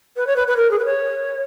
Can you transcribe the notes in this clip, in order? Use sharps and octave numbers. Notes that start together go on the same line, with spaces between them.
B4
C#5
B4
B4
A#4
G#4
B4
C#5